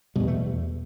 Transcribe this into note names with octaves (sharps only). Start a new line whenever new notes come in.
E2 B2 G3
A3